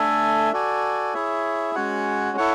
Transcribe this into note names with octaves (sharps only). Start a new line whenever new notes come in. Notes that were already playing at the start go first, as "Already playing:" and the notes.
Already playing: A3 D4 A4 E5 G#5
F#4 A4 D5 G#5
E4 G#4 C#5 E5
G#3 C#4 F#4 C#5 F#5
E4 A4 C#5 F#5